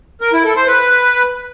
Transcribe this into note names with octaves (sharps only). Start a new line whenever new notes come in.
A#4
E4
A4
C5
B4